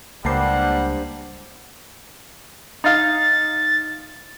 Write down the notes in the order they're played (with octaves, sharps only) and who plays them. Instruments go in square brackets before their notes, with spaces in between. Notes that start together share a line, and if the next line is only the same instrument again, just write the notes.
[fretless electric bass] C#2 [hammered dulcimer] G2 C5 [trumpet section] G3 F#5 [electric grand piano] A#3 A5 C7
[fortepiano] D#4 F5 [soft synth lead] A6